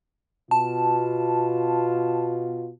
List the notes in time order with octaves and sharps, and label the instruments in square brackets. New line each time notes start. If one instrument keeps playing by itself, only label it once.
[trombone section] B2 F4 [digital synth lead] A5